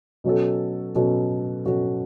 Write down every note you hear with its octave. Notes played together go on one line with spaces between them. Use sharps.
B2 F#3 C#4 F#4 A4
B2 F#3 C#4 F#4 A4
B2 F#3 C#4 F#4 A4